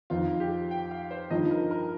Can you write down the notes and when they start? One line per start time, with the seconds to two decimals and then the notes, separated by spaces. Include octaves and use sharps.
0.10 F2 F3 C4 D#4 F4
0.40 G4
0.71 G5
0.91 F5
1.11 C5
1.31 G2 F3 D#4 D#5
1.51 A#4
1.71 A#4